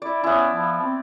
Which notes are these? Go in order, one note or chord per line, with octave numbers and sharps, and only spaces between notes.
E4 D5
B3 C#4 E4
F3
C4